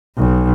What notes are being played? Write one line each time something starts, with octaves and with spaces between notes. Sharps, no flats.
B1